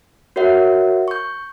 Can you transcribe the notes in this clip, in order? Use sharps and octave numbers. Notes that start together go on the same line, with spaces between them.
F#4 A#4 C#5 E5 F#5
C#6 G6